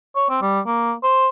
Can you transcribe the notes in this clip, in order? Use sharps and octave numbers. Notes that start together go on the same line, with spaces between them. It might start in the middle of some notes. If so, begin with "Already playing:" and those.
C#5
C4
G3
A#3
C5